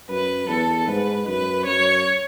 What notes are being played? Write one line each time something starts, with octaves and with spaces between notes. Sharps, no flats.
F#2 B4
E2 A4
G#2 B4
F#2 B4
F#2 C#5